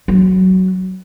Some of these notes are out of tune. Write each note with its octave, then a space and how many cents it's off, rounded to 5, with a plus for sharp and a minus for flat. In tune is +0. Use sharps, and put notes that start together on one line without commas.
F#3 +15